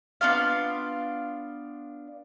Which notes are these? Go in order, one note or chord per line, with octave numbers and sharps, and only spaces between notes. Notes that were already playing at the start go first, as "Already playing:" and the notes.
B3 D4 F4 F5